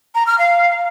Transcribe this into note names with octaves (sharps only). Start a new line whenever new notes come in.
A#5
F6
F5